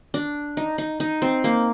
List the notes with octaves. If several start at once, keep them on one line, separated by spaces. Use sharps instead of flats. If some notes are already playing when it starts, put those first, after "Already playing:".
D4
D#4
D#4
D#4
C4
A#3